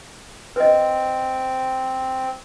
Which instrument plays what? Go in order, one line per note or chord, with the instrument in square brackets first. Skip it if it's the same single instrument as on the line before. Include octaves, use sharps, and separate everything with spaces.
[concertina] C4 [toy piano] B4 D#5